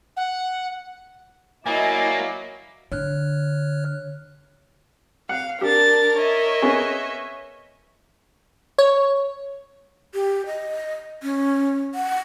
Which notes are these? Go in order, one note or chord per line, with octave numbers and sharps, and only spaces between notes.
F#5
F#3 A#3 E4 D5 D#5 G#5
D3 C#5 F6 F#6
F5 F#5
D4 G4 A#4 A6
C#5 D#5 E5
B3 C#4 G#4
C#5
G4
D#5
C#4
F#5